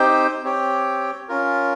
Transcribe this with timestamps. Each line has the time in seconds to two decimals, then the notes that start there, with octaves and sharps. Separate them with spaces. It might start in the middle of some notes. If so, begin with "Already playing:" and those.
Already playing: C4 D#4 G4 C5 G5
0.43 C4 G4 C#5 G5
1.28 C#4 F4 A#4